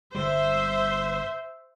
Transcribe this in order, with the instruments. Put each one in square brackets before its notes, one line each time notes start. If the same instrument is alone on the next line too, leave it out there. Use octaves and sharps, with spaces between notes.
[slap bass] G1 D3 G3 [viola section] C5 E5